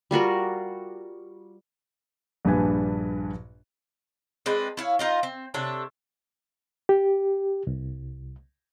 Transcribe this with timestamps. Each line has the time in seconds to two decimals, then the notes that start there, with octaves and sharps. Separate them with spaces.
0.11 G3 F4 F#4 A#4
2.45 A#1 G2 D4 B4 G#5
4.46 G#3 C4 D4 B4
4.77 E4 C#5 F5
4.99 D#4 F4 D#5
5.23 C4
5.54 C3 D4 A4 C#5
6.89 G4
7.67 C2